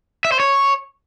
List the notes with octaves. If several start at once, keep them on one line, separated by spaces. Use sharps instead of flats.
E5
C5
C#5